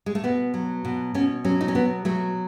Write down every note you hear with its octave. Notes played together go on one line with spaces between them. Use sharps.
G#3
A3
B2 B3
F#3
B2
B2 C#4
F#3 C#4
D#4
C#4
B2 B3
F#3 A3